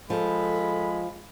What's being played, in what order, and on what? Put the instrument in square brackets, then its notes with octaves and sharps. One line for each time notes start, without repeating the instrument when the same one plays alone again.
[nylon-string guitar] F3 [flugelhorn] G#3 [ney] A4 [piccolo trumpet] B5